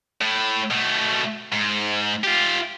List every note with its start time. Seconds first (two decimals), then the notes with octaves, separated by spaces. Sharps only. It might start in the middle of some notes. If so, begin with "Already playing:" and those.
0.21 A2
0.70 B2 A3
1.52 G#2
2.24 F4 G4